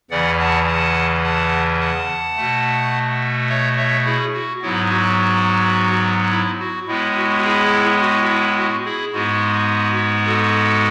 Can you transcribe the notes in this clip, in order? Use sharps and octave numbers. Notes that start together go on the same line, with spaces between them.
E2 C#3 E3 D5 F#5
F#5 A5
F#5 A5
F#5 A5
F#5 A5
B2 A3
C#5 E5
C#5 E5
E4 G#4
F#4
G#2 F#3 B3 E4
F#4
E4
F#4
A2 G#3 B3 E4
F#4
E4 G#4
F#4
E4
F#4
E4 G#4
G#2 G#3 B3 F#4
F#4 A4